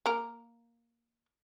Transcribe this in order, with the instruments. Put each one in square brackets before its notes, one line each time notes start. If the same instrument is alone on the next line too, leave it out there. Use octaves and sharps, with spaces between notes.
[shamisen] A#3 A#4